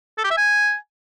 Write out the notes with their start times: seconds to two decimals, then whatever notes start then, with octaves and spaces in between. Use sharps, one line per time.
0.18 A4
0.24 G4
0.31 E5
0.37 G#5